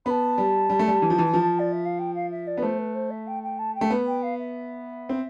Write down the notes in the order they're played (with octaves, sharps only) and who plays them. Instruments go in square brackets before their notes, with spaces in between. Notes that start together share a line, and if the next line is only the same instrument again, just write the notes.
[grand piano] B3 [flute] A5 B5
[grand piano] G3
G3
A3
G3
E3
F3
E3
F3
[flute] D5
E5
F5
G5
F5
E5
D5
[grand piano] B3
[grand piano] A3 [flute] C5
[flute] B4
C5
E5
G5
G5
A5
G5
[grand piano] A3
B3
[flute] G5
F5
E5
[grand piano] C4